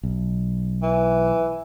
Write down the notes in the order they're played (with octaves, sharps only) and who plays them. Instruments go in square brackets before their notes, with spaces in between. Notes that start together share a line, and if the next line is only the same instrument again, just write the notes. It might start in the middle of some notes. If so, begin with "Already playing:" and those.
[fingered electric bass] B1
[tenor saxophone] E3